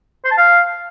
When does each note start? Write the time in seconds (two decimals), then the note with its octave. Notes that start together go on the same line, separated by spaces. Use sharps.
0.25 C5
0.31 A5
0.38 F5